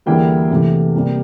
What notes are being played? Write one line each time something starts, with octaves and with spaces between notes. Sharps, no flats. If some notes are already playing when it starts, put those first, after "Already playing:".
E2 D3 G3 A#3 E4 G5
C3 E3 A3
C3 G3 A#3